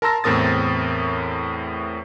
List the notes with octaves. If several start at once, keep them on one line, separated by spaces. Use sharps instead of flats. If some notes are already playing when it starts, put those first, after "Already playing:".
A#4 A5 A#5 C6 E6 A#6
E2 A2 C4 A#4 D#6 A6